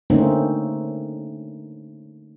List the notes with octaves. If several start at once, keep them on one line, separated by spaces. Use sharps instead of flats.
D3 A3 A#3 C4 C#4 D#4